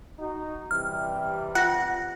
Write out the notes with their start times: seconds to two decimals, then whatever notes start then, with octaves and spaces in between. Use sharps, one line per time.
0.19 D#4 F#4
0.71 C3 E3 G3 F6
1.55 F4 F#5 A#6